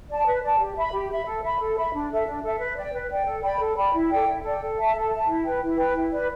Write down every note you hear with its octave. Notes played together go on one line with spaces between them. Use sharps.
D5 A5
B4
D5 A5
G4
E5 B5
G4
E5 B5
A4
E5 B5
A4
E5 B5
D4
A4 E5
D4
A4 E5
B4
D5 G5
B4
D5 G5
A4
D5 G5 B5
A4
D5 G5 B5
E4
A4 D5 G5
E4
A4 D5 G5
A4
E5 A5
A4
E5 A5
E4
B4 G5
E4
B4 G5
E4
B4 D5